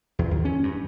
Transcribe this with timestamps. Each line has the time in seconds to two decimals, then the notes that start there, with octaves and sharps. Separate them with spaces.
0.19 E2
0.31 D#2
0.45 C#4
0.63 G2